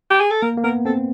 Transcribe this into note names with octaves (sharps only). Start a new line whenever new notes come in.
G4
G#4
A4
A#3 A#4
A#3
B3 A#4
C4 A4